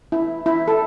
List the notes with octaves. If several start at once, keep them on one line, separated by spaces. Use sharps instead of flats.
E4
E4
A4